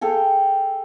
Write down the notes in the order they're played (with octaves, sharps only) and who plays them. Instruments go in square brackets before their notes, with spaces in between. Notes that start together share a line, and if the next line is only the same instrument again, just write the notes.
[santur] G#4 A4 F5 G5